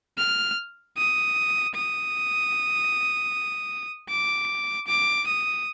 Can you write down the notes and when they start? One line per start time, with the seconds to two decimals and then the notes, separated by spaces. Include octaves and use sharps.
0.18 F6
0.97 D#6
1.74 D#6
4.09 D6
4.87 D6
5.27 D#6